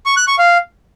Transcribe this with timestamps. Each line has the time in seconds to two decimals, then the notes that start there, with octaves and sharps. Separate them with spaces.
0.06 C#6
0.17 F#6
0.28 C#6
0.38 F5